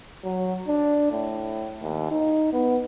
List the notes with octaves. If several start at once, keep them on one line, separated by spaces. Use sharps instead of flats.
F#3
D4
A2
D#2
D#4
B3